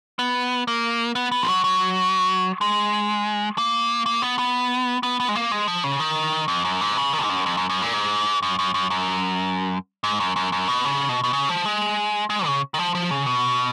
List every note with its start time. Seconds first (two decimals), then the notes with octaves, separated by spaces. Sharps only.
0.19 B3
0.68 A#3
1.15 B3
1.32 B3
1.42 F3
1.48 F#3
1.64 F#3
2.61 G#3
3.58 A#3
4.06 A#3
4.22 B3
4.39 B3
5.03 B3
5.20 B3
5.29 G#3
5.35 A#3
5.52 G#3
5.68 F3
5.84 C#3
6.00 D#3
6.48 F2
6.64 F#2
6.81 G#2
6.97 C#3
7.13 D#3
7.23 G#2
7.30 F#2
7.46 F2
7.57 F#2
7.69 F#2
7.82 A#2
7.94 G#2
8.43 F#2
8.59 F#2
8.74 F#2
8.90 F#2
10.04 G#2
10.20 F#2
10.36 F#2
10.52 F#2
10.68 B2
10.84 C#3
11.09 B2
11.24 B2
11.33 C#3
11.49 F3
11.65 G#3
12.30 G#3
12.46 C#3
12.74 D#3
12.79 F3
12.95 F3
13.11 C#3
13.26 B2